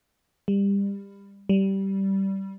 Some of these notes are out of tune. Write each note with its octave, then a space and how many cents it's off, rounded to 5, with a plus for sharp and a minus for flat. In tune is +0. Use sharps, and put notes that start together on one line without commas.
G3 +25
G3 -15